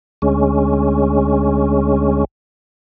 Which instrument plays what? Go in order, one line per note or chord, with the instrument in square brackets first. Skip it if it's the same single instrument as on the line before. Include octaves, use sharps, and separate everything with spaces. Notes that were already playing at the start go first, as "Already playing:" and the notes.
[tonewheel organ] D2 G#3 C#4